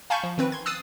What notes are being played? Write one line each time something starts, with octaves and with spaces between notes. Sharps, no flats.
F5 G#5 A5 B5 C#6 G6
F3
D#3 C4 B4
C6 G#6
D#6 E6 F#6 A6 C7 D#7